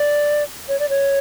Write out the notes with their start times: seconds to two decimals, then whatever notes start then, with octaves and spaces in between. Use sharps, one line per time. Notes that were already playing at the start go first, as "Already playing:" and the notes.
Already playing: D5
0.69 C#5
0.80 D5
0.89 C#5